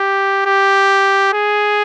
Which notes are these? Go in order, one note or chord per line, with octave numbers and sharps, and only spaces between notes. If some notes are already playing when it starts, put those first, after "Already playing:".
Already playing: G4
G4
G#4